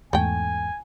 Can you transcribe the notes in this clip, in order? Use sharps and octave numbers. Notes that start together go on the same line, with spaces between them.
E2 G#2 A3 G5 G#5